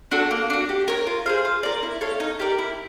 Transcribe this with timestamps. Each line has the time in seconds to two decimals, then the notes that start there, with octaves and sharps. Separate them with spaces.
0.11 D4 F#4 A4
0.31 A#3
0.50 D4 F#4
0.69 G4
0.88 A#4 C#5
1.07 F4
1.26 G#4 C5 F5
1.45 F4
1.63 A#4 D5
1.83 E4
2.01 A4 C#5 F5
2.20 D#4
2.40 G4 A#4 D5
2.59 E4